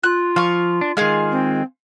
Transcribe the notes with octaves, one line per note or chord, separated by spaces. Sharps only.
F4 F#6
F3 F5 C#6
D4
D#3 G#3 F4 G#4 F5
C4